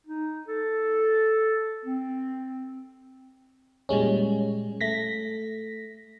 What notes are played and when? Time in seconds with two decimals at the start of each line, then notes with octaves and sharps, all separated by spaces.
0.07 D#4
0.48 A4
1.85 C4
3.89 A#2 G3 G#3 C#4
4.81 A3 A#6 B6